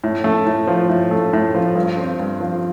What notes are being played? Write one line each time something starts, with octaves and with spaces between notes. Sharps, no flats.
A2
A3
A2
F3
A2
A3
A2
F3
G2
C4
G2
F3